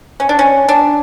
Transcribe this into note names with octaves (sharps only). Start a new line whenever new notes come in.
C#4
D4
C#4
D4